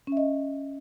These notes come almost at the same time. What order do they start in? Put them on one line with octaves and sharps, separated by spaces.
C#4 E5 D#5